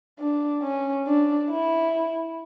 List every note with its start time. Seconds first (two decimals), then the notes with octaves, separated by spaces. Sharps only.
0.19 D4
0.63 C#4
1.07 D4
1.50 E4